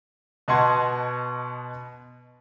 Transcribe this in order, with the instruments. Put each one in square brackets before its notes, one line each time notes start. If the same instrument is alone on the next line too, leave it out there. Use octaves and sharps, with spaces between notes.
[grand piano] B2 D#5 F#5 A5 C6 G#6